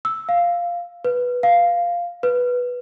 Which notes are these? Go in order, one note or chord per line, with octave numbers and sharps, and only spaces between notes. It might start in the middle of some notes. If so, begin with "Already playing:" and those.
E6
F5
B4
F5
B4